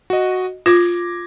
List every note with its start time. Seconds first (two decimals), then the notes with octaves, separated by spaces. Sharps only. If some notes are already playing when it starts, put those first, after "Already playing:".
0.10 F#4 D#5
0.66 F4 D6 G#6 A#6